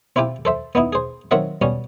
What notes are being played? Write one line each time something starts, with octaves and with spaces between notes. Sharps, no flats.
C4 E4 F4 G4 G5
A4 C5 E5
B3 D#4 E4
G#4 C5
D#3 F#3 C4 A#4 E5 F#5
B2 G3 C#4